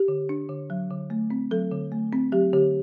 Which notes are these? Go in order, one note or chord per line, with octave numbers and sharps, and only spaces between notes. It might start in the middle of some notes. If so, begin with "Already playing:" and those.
Already playing: G4
D3
D4
D3
F#3
D3
A3
C4
F#3 A4
D3
A3
C4
F#3 G4
D3 G4